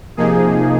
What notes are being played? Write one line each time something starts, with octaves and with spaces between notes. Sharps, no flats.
C3 F3 A#3 D#4 G#4